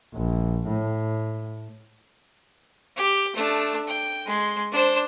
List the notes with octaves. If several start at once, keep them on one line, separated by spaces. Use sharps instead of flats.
A#1
A2
G4
A3 D4
G5
G#3 C6
D4 C5